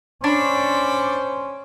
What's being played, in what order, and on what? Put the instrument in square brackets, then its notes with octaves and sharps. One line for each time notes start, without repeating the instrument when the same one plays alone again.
[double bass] C#4 [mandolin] D4 [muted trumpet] C5 [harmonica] B5 C#6 D6